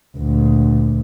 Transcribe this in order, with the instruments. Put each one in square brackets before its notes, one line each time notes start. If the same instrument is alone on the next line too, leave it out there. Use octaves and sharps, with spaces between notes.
[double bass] D2 A#2